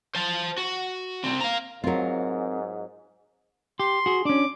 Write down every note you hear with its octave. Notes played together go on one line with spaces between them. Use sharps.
C5 A5
F#4
C2 C4
F5 A#5
G#2 F#3 C4 F4 A#4
G4 C6
F#4 G#4
C#4 D4 D6